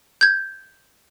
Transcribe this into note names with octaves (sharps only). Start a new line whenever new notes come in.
G6 G#6